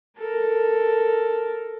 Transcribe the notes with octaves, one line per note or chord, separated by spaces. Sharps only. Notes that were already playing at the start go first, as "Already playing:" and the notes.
A4 A#4